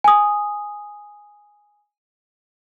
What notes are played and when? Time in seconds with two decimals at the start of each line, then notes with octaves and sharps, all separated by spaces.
0.04 G#5 D#6